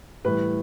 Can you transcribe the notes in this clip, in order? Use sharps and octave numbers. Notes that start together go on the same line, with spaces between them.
A2 E3 G3 B4